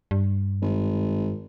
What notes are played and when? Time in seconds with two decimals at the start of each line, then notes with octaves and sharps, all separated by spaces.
0.11 G2
0.62 G#1